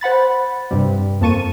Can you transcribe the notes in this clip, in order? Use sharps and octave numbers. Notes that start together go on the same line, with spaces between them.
C5 F#5 B5 A6
G2 C3 G3
F2 A#3 A5 C#6 D#7